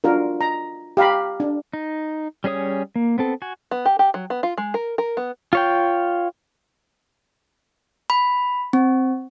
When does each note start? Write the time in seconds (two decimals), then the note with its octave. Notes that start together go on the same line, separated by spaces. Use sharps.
0.04 D4 F4 F#4 A#4
0.41 A#5
0.97 G4 F5 A#5 B5
1.40 D4
1.73 D#4
2.44 G3 C#4 G#4 C#5 D#6
2.96 A#3
3.18 B3 C4 A4
3.42 F#4 G#5
3.71 B3
3.86 G4
3.99 G4
4.14 F#3
4.30 B3
4.43 F4
4.58 G#3
4.74 A#4
4.98 A#4
5.17 B3
5.53 F4 C#5 G5
8.10 B5
8.73 C4